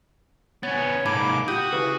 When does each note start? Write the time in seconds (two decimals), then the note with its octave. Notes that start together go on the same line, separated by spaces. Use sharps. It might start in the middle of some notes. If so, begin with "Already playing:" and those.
0.63 B3 C#4 C#5 A6
1.06 G#2 A#3 A5 B5 D6 G#6
1.48 F#4 G4 D#6 G6
1.72 C#3 E3 B4